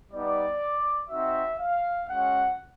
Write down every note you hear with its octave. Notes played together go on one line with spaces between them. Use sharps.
G3 B3 D#4 D5
C4 D#4 F#4 E5
F5
G#3 C#4 F#4 F#5